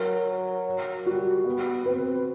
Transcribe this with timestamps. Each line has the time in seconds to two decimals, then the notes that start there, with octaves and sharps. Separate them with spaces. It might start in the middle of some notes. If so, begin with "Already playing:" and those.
Already playing: F#3 A#4
1.06 G3 F#4
1.45 B3
1.86 C4 B4